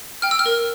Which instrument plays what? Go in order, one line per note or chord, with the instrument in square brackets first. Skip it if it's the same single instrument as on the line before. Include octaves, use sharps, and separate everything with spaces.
[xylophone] G5 F6
E6
F6
A#4